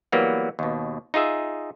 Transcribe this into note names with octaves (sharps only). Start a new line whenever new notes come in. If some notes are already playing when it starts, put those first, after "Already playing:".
E3 F#3 G3 A#3 B3
D#2 B2
D#4 F4 G#4 E5